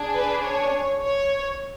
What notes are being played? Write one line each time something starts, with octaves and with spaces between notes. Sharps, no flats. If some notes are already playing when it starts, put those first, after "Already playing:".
Already playing: D4 G#4
B4
C#5
C#5